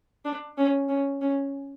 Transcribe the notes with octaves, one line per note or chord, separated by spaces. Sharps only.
D4
C#4
C#4
C#4